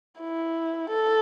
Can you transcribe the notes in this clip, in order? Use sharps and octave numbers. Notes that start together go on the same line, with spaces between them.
E4
A4